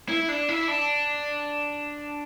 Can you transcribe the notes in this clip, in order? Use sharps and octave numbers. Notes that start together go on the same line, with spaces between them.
E4
D4
E4
D4